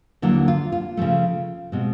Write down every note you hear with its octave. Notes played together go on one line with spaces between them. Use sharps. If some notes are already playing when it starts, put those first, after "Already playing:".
D#2 D3 F#3 A#3 E4
F4
F4
C#3 F3 A3
B2 G#3 C4